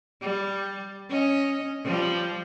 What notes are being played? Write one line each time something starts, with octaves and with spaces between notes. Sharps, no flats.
G3
C#4 D#5
F3 G3